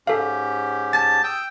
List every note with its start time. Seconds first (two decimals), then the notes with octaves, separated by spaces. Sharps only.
0.07 G#2 C#4 G4 A4 F5
0.93 A5 A6
1.24 G5 D#6 E6